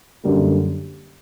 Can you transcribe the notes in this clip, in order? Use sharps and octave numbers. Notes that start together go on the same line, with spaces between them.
F#2 D3 G3 A#3